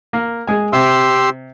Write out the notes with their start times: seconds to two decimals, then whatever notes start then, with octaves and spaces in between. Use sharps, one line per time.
0.13 A#3
0.47 G#3 G#5
0.73 C3 G4 C6 E6